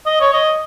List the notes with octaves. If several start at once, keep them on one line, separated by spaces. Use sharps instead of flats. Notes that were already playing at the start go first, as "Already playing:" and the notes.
D#5
C#5
D#5